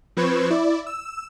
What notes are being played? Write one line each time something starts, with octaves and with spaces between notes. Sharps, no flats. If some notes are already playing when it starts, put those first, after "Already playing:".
F3 C4 B4 C#6 G#6 E7
E4 D5
E6